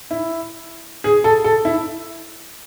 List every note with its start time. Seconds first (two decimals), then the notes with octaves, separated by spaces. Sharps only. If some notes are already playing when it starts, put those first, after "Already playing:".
0.11 E4
1.04 G#4
1.24 A4
1.44 A4
1.65 E4